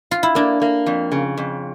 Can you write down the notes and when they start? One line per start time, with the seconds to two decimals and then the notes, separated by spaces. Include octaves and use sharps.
0.11 F4
0.23 E4
0.35 A#3 D4
0.62 A#3
0.86 F2
1.12 C#3
1.37 F2